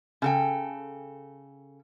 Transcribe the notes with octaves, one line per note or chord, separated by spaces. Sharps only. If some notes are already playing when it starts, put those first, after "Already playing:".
C#3 A4 G5